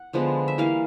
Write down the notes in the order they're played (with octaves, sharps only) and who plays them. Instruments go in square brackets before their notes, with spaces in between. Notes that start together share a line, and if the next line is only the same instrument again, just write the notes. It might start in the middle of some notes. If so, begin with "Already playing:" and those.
Already playing: [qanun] F#5
D3 F3 G#3 B3
E5
E3 G3 A#3 F5